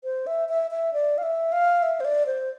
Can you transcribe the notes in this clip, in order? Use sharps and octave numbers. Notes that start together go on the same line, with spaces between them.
C5
E5
E5
E5
D5
F5
E5
F5
E5
C5
D5
C5